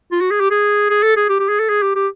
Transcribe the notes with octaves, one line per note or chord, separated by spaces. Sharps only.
F4
F#4
G#4
G4
G#4
G#4
A4
G#4
G4
G4
G#4
A4
G#4
G4
G4